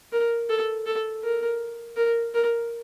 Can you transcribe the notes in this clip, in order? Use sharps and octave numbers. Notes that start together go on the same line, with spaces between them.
A#4
A4
A4
A#4
A#4
A#4